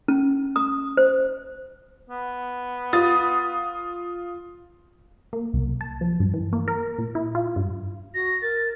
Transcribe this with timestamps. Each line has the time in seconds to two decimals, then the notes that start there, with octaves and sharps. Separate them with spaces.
0.08 C#4
0.56 D#6
0.97 C5
2.10 B3
2.93 F4 D#6 A6
5.33 A#3
5.54 C2
5.81 A5
6.01 F3
6.20 G2
6.34 E3
6.53 A#3
6.68 A#4
6.98 A#2
7.15 E4
7.35 F4
7.56 G2
8.14 F#4 A#6
8.42 A#4 A6